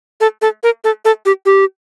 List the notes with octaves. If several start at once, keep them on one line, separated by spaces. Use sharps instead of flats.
A4
A4
A#4
A4
A4
G4
G4